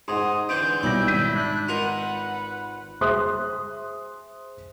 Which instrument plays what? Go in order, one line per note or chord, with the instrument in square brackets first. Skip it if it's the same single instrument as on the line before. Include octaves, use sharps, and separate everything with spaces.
[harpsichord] G#2 [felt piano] D#4 F#5 C6 [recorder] D#6
[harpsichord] D3 E3 C4 [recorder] G6 [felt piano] D7
[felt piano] B1 G3 A#6 [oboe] E4 [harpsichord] D5
[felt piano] G#1 B6 D#7
[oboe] D4 [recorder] F#6
[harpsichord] F4 A#4 D#5 [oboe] B4 [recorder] F#5
[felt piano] G#4 C5 E5 C6 D#6 F#6